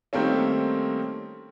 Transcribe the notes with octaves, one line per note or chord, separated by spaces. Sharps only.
D#3 G3 A3 A#3 C4 C#4